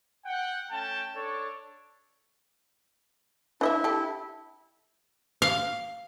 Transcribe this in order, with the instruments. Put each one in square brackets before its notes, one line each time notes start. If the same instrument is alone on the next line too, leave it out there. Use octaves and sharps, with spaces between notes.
[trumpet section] F#5 G5
A3 C#4 G5 A5
D4 A4 C#5
[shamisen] D4 D#5 E5 [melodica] E4
[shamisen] G4 A4
[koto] F5